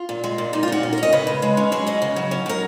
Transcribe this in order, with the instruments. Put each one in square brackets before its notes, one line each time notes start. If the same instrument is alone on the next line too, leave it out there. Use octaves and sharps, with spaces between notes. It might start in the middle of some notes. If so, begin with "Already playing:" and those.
Already playing: [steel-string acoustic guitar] F4
A#2
G#3
A#2
A#2 D#4
F4
A#2 F#4
C#4
A#4
C#4
D#5
C#3 B4
G#3
G#3
C#4
F#3 G#4
C#4 D#5
C#3
F#3
C#4
F#3 A#4